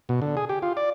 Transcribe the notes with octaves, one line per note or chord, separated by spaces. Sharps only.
B2
D3
G#4
G4
F4
D5